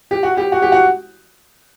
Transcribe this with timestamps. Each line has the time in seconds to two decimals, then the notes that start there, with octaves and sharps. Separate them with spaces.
0.11 G4
0.23 F#4
0.37 G4
0.52 F#4
0.62 G4
0.72 F#4